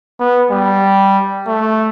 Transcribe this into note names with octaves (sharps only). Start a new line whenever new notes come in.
B3
G3
A3